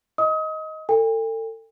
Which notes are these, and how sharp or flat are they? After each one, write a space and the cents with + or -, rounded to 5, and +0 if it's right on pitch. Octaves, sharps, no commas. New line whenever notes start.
D#5 +10 D#6 +35
A4 +35 G5 +45